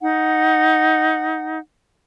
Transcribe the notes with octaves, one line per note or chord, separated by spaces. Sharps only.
D#4 F#5